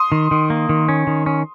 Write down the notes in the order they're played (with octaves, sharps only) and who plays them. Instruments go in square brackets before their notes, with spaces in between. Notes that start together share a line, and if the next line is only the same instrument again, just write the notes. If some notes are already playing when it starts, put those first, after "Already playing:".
Already playing: [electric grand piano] C6 D#6
[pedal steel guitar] D#3
D#3
A#3
D#3
C#4
D#3
C#4